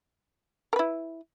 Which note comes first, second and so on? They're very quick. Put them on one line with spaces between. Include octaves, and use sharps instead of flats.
A#4 B4 E4